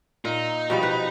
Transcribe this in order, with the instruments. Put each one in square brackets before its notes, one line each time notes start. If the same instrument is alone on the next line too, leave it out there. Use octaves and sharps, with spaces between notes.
[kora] A#2 [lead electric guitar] D#4
[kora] B2 F3 G3
B4